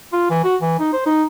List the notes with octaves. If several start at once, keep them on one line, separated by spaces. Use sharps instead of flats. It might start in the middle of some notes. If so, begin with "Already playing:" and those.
F4
E3
F#4
E3
D#4
C5
D#4